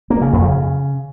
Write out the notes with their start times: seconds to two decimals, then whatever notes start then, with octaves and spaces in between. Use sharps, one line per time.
0.10 A#3
0.22 C#3
0.33 F2
0.44 C#3